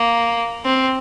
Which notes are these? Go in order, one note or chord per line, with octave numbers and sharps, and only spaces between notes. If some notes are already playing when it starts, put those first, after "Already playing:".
Already playing: A#3
C4